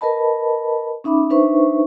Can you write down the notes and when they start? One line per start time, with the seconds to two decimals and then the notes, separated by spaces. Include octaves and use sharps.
0.01 A#4 B4 D#5 A5 B5
1.04 C#4 D#4 E5 B5 D6
1.30 D4 D#4 B4 C5 E5 C#6